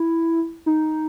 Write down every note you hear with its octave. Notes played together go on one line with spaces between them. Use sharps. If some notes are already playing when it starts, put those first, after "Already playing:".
Already playing: E4
D#4